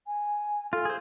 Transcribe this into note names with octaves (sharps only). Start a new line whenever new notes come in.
G#5
F4 A4
G#4 C5